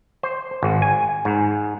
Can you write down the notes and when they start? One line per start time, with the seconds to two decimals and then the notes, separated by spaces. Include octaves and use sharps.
0.23 C5
0.63 G#1
0.82 G#5
1.25 G#2